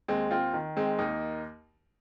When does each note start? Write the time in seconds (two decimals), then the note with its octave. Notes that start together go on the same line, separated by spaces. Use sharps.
0.08 D#2 G#3 C4
0.31 C4 F4
0.53 D#3
0.77 G#3 C4
0.99 D#2 A#3 D#4